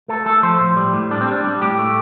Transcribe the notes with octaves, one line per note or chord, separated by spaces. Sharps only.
A3 A4
A3 A4
F3 C5
A2
G3
A2
G3 D4
C4
G3 D4
G3
A2 G4
A3